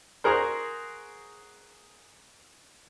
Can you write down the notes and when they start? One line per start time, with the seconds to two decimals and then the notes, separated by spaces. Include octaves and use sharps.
0.24 F#4 G#4 A#4 C5